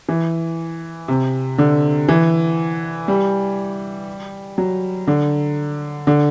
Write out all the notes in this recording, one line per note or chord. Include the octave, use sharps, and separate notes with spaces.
E3
C3
D3
E3
G3
F#3
D3
D3